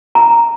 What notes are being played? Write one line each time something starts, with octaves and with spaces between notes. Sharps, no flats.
A#5